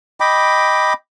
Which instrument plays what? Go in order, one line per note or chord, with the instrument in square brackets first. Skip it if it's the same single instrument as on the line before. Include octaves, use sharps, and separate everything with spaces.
[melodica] D#5 G5 B5 D6